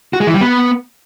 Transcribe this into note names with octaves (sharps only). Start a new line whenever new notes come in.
F#4
G#3
E3
G3
B3